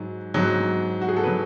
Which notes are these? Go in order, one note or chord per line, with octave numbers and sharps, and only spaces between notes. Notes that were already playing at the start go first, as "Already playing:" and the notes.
Already playing: G#2 F#3
G#2 F#3
F#4
G#4
A4
F#3 B4